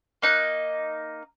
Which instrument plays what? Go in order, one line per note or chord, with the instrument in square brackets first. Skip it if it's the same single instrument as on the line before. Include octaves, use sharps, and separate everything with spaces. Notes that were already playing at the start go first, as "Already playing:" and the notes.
[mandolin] A#3 D#4 F#6